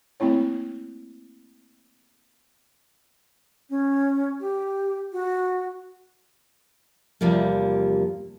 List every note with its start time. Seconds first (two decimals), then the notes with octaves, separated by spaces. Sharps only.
0.20 A3 A#3 C4 E4 C#5
3.70 C#4
4.40 G4
5.13 F#4
7.21 E2 C3 F3 G3 A#3